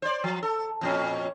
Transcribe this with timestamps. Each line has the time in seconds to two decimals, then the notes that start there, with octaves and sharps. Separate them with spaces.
0.02 C5 D5
0.24 F3
0.43 A4
0.81 F2 A#2 C#4